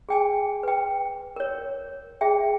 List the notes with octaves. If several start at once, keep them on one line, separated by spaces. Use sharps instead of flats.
G#4 G5 G#5
B4 G5
A#4 C#5
G#4 E5 G5